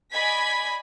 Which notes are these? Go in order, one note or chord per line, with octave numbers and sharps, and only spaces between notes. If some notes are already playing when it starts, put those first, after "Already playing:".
D5 D#5 G#5 B5 G#6 B6